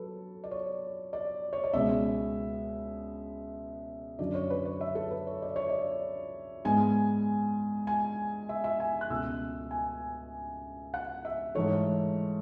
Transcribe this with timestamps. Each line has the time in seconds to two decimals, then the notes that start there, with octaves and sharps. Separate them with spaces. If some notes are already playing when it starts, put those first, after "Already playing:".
Already playing: F#3 A4 B4
0.44 D5
0.51 C#5
1.13 D5
1.53 C#5
1.64 D5
1.73 C#2 B2 G#3 B3 E5
4.19 F#2 D3 F#3 D5
4.35 C#5
4.50 B4
4.65 C#5
4.81 E5
4.95 A4
5.11 B4
5.27 C#5
5.42 D5
5.56 C#5
5.69 D5
6.65 G#2 G#3 B3 G#5
7.87 G#5
8.49 E5
8.64 E5
8.80 G#5
9.01 F#6
9.10 C#2 B2 A3 E6
9.71 G#5
10.94 F#5
11.25 E5
11.55 G#2 E3 A3 C#5